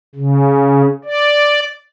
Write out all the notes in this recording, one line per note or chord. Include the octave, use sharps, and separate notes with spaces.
C#3
D5